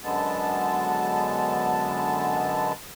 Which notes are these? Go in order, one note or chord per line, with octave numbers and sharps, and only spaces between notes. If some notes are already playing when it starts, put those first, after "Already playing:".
F#2 D3 G#3 B3 A5